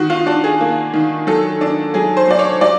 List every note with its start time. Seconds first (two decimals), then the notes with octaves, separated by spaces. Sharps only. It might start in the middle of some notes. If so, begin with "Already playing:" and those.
Already playing: D#3 F#4
0.10 F4
0.26 D4 F#4
0.44 G#4
0.61 A#3
0.94 D#3
1.27 F#3 A4
1.61 D4
1.94 F#3 G#4
2.17 C5
2.27 F#3 D5
2.39 C#5
2.61 F#3 D5